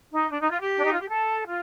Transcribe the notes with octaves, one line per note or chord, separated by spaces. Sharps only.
D#4
D4
D#4
F4
G4
D4
D#4
F4
G4
A4
F4